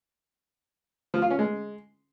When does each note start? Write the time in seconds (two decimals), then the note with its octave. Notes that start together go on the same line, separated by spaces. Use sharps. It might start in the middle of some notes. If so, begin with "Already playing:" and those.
1.14 F3
1.22 F4
1.30 C#4
1.39 G#3